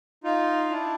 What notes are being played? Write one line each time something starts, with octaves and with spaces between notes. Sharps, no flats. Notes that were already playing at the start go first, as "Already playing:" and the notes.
D#4 F4
D4 E4